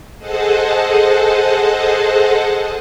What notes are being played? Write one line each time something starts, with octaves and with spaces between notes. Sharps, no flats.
G#4 A4 C5 D#5 F#5 A5